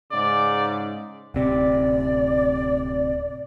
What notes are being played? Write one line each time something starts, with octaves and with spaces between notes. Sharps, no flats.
G#2 C#3 D5
D1 C3 D5